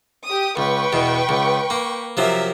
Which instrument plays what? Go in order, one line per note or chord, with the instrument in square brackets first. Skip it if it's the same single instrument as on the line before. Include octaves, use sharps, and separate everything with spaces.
[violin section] G4 D#6
[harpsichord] C#2 [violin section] B4 G5 C#6
[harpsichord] E2 B2
C#2
A#3
[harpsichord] C3 F3 F#3 [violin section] A#4 E5